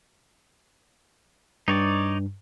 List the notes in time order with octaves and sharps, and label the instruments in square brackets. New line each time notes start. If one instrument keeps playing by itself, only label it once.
[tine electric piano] G2 [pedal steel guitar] D#4 C#5 D5